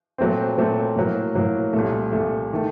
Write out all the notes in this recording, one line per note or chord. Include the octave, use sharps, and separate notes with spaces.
A#2 F#3 A3 C4
A#2 F#3 A3 C4
A2 F#3 A#3
A2 F#3 A#3
C2 A#2 A3
C2 A#2 A3
D#3 A3